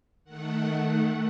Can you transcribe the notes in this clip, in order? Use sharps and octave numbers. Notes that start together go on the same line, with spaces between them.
D#3 A3 F#5